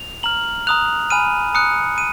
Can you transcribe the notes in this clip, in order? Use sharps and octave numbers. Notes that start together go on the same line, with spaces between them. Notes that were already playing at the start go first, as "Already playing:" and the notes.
Already playing: F7
A#5 F6 F#7
A#5 D#6 F#6 F7
G#5 B5 F6 D#7
A#5 D#6 F#6 C#7
D#7